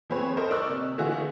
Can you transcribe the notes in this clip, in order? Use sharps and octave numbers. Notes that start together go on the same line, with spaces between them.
F3 B3 C4 G#4 B4 C#5
A4 A#4 C5 D#5
A#4 D5 D#5 C#6 E6 F#6
C3
D3 E3 A3 F4 F#4 G#4